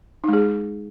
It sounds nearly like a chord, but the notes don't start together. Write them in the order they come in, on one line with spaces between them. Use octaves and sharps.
D#4 G#3 G#4